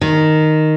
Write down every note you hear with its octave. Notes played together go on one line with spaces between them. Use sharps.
D#3